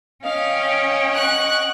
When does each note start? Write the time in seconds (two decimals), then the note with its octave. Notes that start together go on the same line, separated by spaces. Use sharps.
0.25 C#4 D#5 F5 G5
1.14 F#5 C#6 F#6